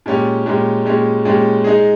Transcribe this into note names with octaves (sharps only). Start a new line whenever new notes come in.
A#2 G#3 C#4 G4
A#2 G#3 C#4 G4
A#2 G#3 C#4 G4
A#2 G#3 C#4 G4
G#3 D#4 G#4